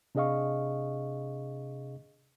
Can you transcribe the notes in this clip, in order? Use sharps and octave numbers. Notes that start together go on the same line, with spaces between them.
C3 D4 G#4 D#5 F5 C#6